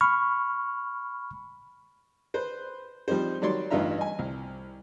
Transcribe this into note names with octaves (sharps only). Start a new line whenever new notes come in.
B5 C#6 F6
B4 C5
F3 G3 C4 D#4 C5
D#3 F#3 G3 C#5 D5 C6
A1 G2 D#4 F4 E5 A#5
D#5 G#5
C2